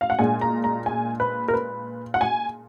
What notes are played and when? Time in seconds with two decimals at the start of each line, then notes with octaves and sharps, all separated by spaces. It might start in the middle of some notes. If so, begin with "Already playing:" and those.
0.01 F5
0.10 F#5
0.19 A#2 G#3 D4 G#5
0.41 A#5
0.64 A#5
0.86 G#5
1.20 B4
1.48 A#4
1.53 B4
2.14 F#5
2.21 G#5